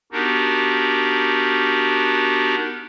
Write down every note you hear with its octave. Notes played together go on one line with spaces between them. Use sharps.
B3 D4 D#4 F#4 G4 A#4